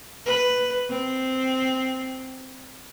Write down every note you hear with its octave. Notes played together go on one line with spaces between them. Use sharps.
B4
C4